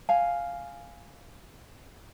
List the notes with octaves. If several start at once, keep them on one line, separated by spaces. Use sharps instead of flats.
F5 G#5